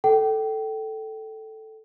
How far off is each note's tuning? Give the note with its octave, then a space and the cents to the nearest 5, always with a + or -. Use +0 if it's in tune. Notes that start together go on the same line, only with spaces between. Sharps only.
A4 +0 G5 -25